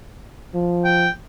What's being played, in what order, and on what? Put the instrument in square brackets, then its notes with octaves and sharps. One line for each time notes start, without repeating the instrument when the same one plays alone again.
[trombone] F3
[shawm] G5